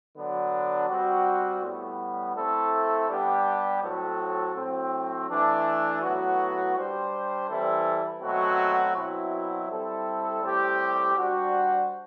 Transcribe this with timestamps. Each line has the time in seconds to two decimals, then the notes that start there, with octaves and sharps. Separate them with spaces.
0.15 D3 F#3 B3 D4
0.89 G3 C4 F#4
1.62 A2 G3 B3
2.35 A3 C4 E4 A4
3.08 G3 B3 D4 G4
3.82 A2 F#3 C4 F#4 A4
4.55 A2 F#3 C4
5.28 E3 A3 D4
6.01 A2 F#3 B3 F#4
6.75 G3 D4 G4 C5
7.48 E3 G3 C4 E4 A4
8.21 B2 F#3 A3 C4 F#4
8.94 B2 F#3 C4 E4
9.68 G3 C4 E4 A4
10.41 A2 G3 C4 G4
11.14 G3 D4 F#4 C5